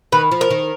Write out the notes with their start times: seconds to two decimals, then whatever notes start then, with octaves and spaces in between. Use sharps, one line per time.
0.12 D#3 B4
0.31 F3
0.41 A#4
0.51 D#3